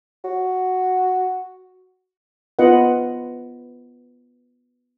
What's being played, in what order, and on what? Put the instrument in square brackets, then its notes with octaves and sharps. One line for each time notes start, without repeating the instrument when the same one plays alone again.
[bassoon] F#4
[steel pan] B3 F4 B4 D#5 F#5